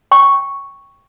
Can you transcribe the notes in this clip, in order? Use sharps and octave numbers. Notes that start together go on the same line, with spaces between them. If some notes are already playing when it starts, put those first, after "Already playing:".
G5 C#6